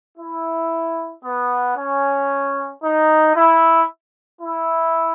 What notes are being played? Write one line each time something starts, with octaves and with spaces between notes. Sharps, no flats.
E4
B3
C#4
D#4
E4
E4